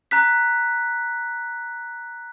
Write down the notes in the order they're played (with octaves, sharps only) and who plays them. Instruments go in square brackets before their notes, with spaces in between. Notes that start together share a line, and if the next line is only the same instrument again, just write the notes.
[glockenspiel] A#5 F#6 B6